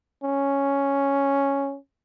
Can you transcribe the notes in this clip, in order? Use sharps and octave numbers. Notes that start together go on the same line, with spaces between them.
C#4